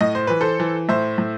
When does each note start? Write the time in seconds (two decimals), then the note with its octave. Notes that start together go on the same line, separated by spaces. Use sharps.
0.01 A2 D#5
0.15 C5
0.27 E3 B4
0.41 A4 C5
0.60 E3
0.89 A2 C5 E5
1.18 A2